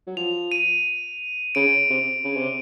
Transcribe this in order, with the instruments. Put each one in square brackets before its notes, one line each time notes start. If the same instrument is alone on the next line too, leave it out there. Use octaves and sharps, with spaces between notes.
[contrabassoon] F#3
[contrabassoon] F3 [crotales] F7
[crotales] D#7
[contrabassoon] C#3 [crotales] D7
[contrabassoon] C3
C#3
C3